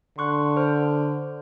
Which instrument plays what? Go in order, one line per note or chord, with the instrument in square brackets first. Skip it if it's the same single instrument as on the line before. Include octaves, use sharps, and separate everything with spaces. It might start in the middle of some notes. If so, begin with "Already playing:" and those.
[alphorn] D3 [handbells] C6 C#6 F#6
[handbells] C5 F6